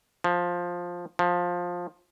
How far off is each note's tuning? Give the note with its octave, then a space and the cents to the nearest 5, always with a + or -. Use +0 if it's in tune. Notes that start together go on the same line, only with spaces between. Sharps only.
F3 +10
F3 +15